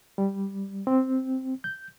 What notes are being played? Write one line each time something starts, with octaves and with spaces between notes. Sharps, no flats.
G3
C4
G6